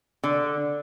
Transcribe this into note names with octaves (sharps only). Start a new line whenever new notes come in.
D3